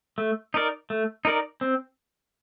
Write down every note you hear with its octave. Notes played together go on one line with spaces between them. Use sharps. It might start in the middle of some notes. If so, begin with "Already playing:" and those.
A3
D#4 A#4 D5
A3
D#4 A#4 D5
C4